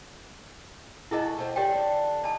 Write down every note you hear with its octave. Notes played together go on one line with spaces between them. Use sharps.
G#3 E4 F#4 G#4 A4 D#5
A3 A#3 C4
D3 D4 G4 C#5 G5
D#4 A4 D5 A5